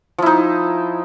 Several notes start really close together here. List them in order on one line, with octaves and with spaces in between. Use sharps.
F3 E4 D#4